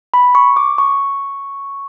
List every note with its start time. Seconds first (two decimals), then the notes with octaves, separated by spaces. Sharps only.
0.14 B5
0.35 C#6
0.57 D6
0.78 C#6